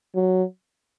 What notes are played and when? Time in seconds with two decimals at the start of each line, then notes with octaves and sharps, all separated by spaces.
0.15 F#3